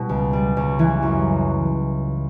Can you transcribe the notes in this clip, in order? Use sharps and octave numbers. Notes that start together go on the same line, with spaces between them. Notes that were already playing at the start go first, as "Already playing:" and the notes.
Already playing: B2 E3 G3
C#2
G3
C#2
E3
F#2